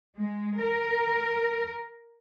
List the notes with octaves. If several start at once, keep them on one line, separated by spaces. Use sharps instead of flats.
G#3
A#4